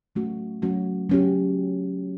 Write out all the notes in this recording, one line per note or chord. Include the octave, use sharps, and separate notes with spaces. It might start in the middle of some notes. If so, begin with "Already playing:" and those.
F#3 A3 C#4 F#4
F#3 A3 C#4 F#4
F#3 C#4 G4